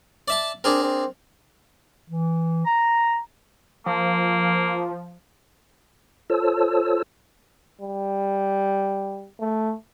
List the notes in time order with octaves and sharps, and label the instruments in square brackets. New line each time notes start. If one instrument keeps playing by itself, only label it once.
[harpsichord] D5 E5 A5
[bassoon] C4 [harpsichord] D4 G#4 A#4
[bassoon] C4
[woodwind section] E3
A#5
[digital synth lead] F3 [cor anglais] A#3
[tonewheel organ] F4 A4 C5 C#5 A5 E6
[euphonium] G3
A3